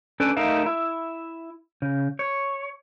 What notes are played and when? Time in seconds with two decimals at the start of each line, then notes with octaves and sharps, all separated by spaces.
0.20 C#4 D4 A4 B4
0.37 A3 D#4 A#4 E5 F5
0.66 E4 E5
1.82 C#3
2.19 C#5